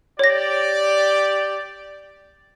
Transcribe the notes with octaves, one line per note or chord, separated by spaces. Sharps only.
G4 C#5 D5 A#6